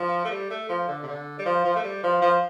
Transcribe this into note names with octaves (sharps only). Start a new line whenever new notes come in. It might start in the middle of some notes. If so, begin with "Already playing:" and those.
Already playing: F3
A3
G3
A3
F3
D3
C3
D3
G3
F3
F3
A3
G3
F3
F3